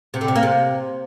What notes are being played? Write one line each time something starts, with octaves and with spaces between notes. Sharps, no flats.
C3
D3
C3
A#3
C3